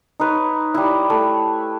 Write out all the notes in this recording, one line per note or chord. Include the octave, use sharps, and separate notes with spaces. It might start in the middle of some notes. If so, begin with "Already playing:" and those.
D#4 B4 C#5
G3 E4
A3